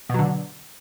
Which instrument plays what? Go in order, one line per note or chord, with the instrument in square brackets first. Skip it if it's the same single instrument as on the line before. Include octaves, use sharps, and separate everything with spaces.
[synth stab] B2
F#3
D3